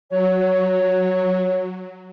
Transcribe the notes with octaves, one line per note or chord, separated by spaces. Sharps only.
F#3 C#5